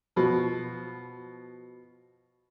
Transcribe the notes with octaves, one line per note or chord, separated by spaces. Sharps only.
B2 F3